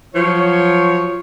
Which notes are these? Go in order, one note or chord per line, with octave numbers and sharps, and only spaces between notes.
F3 F#3 C#5